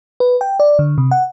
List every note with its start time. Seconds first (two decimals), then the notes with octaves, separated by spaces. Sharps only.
0.20 B4
0.41 G5
0.60 D5
0.79 D3
0.98 C3
1.11 F#5